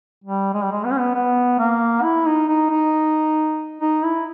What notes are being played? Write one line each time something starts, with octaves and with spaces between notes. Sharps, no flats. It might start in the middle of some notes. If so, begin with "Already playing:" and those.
G3
G#3
G3
G#3
B3
C#4
B3
B3
A#3
E4
D#4
D#4
D#4
D#4
E4